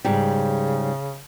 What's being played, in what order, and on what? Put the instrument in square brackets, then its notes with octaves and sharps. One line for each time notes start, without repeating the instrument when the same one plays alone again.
[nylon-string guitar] G#2 G3 [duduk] C#3